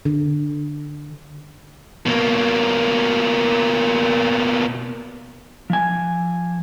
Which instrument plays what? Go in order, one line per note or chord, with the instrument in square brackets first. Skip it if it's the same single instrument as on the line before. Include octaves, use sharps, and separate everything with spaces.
[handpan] D3
[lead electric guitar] B2 A#3
[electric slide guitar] F3 G#5